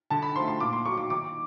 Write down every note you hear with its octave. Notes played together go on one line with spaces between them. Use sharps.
D3 A5
B5
F3 A3 C6
C6
A#2 D6
C6
F#3 A#3 C#6
D6
D#3 D6